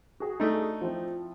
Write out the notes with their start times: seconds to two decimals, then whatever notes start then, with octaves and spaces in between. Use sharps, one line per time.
0.20 F#4 G#4
0.40 A3 D4 D#4
0.81 F3 C4 E4